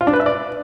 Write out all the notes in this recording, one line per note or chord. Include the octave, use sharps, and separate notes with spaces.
F4
D4
B4
E5
D5